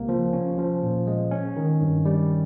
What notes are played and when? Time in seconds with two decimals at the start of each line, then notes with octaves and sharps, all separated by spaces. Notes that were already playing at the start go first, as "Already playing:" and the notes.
Already playing: C#2 C3 A#3
0.09 F3
0.33 C#4
0.59 F3
0.82 A#2
1.07 G#3
1.31 C#4
1.56 D#3
1.81 G2
2.05 G3